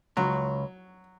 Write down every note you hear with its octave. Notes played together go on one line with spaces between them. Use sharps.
C#2 F#3